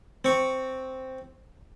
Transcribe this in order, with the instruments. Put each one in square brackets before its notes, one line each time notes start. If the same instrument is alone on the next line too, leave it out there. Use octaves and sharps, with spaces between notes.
[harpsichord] C4 C#6